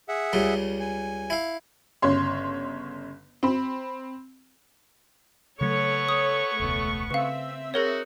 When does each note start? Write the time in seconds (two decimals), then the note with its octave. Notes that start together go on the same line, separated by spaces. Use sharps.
0.09 G#4 E5 F#5
0.33 C#2 C#3 G3
0.80 G#5
1.30 E4 F5
2.02 G1 C#3 C#5 C6
3.43 C4 B5
5.61 C#3 F#3 A3 B3 A4 C#5 C#6
6.09 D#6
6.60 E1 C#2 B2 A3
7.11 C#3 C4 B4 E5 F5
7.74 D#4 F#4 G#4 A#4 C#5